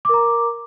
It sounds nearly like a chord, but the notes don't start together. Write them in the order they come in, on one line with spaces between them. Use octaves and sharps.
D6 A#4 A#5